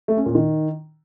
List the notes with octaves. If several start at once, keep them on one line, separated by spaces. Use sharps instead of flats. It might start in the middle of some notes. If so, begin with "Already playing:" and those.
A3
C#4
A#2
D#3